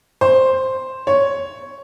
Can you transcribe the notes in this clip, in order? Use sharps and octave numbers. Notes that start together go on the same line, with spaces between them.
C5
C#5